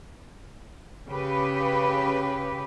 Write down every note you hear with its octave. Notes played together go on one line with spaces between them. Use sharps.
C#3 G4 B4